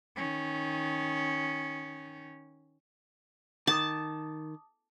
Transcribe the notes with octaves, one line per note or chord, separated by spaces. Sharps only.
D#3 C#4
D#3 A5 D6 D#6